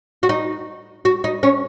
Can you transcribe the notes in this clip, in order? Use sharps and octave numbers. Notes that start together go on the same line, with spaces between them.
F#4
D#4
F#4
D#4
C#4